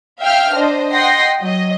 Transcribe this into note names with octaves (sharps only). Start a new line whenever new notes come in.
E5 F5 G5 F6
D4 C5 D#5
D#5 F#5 G5 C6 A#6 C7
F#3 D#5